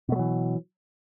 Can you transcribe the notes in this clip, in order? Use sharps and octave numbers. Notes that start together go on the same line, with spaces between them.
B2 E3 F#3 A3